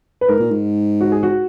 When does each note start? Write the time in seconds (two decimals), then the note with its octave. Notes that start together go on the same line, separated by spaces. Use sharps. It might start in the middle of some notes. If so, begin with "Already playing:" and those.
0.21 B4
0.29 G#2 A#4
0.39 A#2
0.51 G#2
1.01 F#4
1.12 G#4
1.23 F#4